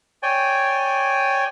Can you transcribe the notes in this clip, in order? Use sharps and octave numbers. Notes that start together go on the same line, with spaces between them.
C#5 D5 G5 G#5